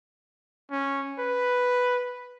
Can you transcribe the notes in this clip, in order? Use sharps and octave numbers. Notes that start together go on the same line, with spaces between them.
C#4
B4